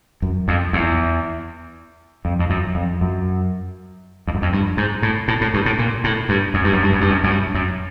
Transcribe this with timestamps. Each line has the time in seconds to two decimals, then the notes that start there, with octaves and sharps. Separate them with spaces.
0.22 F#2
0.48 F2
0.73 E2
2.25 F2
2.39 F2
2.50 F#2
2.75 F2
3.01 F#2
4.27 F2
4.35 F#2
4.42 F2
4.53 G2
4.77 G#2
5.03 A2
5.28 A2
5.41 A2
5.54 G2
5.66 A2
5.79 A#2
6.04 A2
6.29 G2
6.54 F#2
6.64 G2
6.73 F#2
6.83 G2
6.92 F#2
7.01 G2
7.10 F#2
7.24 F#2
7.30 G2
7.55 F#2